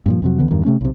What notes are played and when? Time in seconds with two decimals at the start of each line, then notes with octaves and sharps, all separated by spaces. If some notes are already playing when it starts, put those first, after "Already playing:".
0.06 G2 A#2 F3
0.22 F2 C3 F#3
0.38 C#2 D3 E3 B3
0.51 E2 G2 D#3
0.65 C3 A3 C#4
0.81 B1 C3